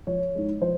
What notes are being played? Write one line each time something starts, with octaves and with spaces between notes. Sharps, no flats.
F3 C#5
G#3 D#4
F3 C5